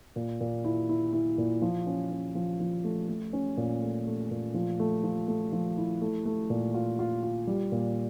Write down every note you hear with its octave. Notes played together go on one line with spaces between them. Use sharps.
A#2
A#2
E4
E4
E4
A#2
F3
C#4
C#4
F3
F3
A3
A3
C#4
A#2
A3
A3
A#2
F3
A3
F3
A3
F3
E4
A3
A3
A#2
F4
F4
F4
G3
A#2